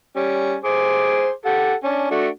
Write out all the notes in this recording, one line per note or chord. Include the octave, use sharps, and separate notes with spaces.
G3 C#4
G#4 C5 D6
G4 A4 F#5
C#4 D4
A3 D4 F#4